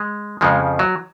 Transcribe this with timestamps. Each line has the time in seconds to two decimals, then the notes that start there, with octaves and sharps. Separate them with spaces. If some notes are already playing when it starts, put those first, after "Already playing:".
Already playing: G#3
0.41 F2 C#3 F3 G#3
0.79 F#3